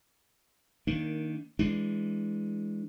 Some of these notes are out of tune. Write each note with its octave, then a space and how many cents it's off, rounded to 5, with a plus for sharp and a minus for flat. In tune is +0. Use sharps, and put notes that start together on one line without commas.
D#3 +5 A#3 -5 D4 -15
E3 +0 G#3 +0 D4 -5